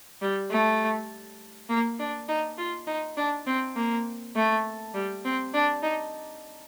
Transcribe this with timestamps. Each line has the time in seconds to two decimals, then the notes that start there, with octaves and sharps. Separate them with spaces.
0.22 G3
0.51 A3
1.70 A#3
1.99 D4
2.28 D#4
2.58 F4
2.87 D#4
3.17 D4
3.47 C4
3.76 A#3
4.36 A3
4.94 G3
5.25 C4
5.54 D4
5.83 D#4